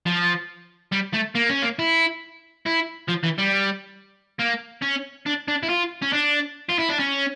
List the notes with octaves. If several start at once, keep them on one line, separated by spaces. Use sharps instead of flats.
F3
G3
A3
A#3
C#4
A#3
E4
E4
F3
E3
G3
A#3
C#4
D4
D4
E4
F4
C#4
D4
F4
E4
D4
C#4